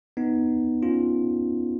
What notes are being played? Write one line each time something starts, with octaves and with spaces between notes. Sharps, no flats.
B3 D#4
C#4 F4